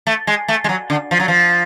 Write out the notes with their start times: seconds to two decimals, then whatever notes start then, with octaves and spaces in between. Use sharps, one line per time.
0.07 A3
0.27 G#3
0.48 A3
0.64 G#3
0.69 F#3
0.90 D3
1.11 F3
1.20 F#3
1.28 F3